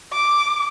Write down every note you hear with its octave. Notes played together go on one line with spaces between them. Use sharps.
D6